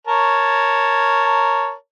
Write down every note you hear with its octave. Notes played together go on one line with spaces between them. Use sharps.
A#4 C#5 A5